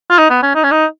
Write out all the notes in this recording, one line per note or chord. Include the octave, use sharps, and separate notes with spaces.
F4
D#4
B3
C#4
D#4
C#4
D#4